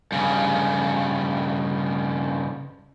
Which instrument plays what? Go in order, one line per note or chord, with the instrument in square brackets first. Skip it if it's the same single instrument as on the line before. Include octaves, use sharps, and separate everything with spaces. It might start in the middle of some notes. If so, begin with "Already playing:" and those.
[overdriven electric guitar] G2 C#3